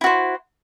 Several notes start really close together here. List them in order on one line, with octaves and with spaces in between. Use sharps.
E4 F#4 C5